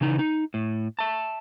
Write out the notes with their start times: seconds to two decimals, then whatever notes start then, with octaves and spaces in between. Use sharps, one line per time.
0.01 C#3 E3 D#4
0.19 D#4
0.54 A2
0.99 E5 A5